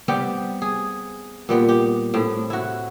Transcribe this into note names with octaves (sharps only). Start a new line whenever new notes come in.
G3 B3 C4 G4
G#4
A#2 G3 B3
G4
A2 C4
E4 F#4